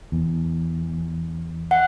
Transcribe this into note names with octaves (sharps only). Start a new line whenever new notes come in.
E2
F#5